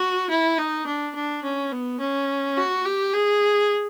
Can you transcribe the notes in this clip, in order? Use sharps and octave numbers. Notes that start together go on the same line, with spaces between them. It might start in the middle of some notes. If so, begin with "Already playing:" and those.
Already playing: F#4
E4
D#4
D4
D4
C#4
B3
C#4
F#4
G4
G#4